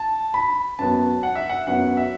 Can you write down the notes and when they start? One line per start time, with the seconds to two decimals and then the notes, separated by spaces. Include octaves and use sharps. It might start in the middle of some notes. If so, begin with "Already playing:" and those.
Already playing: A5
0.34 B5
0.79 F#2 F#3 B3 A5
1.23 F#5
1.35 E5
1.49 F#5
1.67 F#2 F#3 B3 F#5
1.97 E5